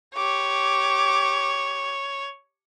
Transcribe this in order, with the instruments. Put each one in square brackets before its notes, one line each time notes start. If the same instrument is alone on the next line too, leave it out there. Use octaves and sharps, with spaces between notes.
[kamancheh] G4 D6 [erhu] C#5